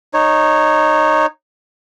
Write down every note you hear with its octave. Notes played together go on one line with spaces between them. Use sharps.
D#4 C#5